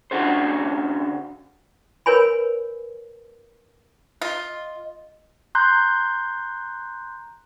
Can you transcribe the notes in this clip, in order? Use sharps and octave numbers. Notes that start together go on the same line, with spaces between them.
D3 C#4 D4 F#4 A4 C5
A#4 B4 C#5 G#5 B5
F4 D#5
A#5 C6 F#6 G6